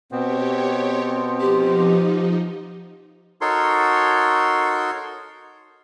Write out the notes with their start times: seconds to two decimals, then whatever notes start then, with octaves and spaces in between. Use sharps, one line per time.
0.12 B2 B3 C4 G4 C#5
1.40 F3 D#4 G4
3.41 D#4 F#4 A4 A#4 C#5 C6